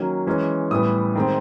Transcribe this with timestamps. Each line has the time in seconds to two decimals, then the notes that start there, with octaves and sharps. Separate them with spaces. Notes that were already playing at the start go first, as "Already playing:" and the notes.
Already playing: D#3 F#3 A#3 C#4
0.27 E3 G#3 C#4
0.71 A2 E3 G3 B3 D#6
1.15 D#3 G#3 C4